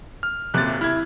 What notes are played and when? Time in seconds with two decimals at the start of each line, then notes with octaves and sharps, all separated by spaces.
0.23 F6
0.54 D#1 F#2 C3 F#6 A6
0.81 E4 F6 G#6